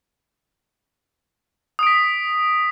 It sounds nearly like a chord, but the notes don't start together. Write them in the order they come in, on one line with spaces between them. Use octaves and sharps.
D#6 D7 B6